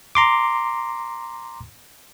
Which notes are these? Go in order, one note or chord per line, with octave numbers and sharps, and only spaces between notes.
A#5 C6 D6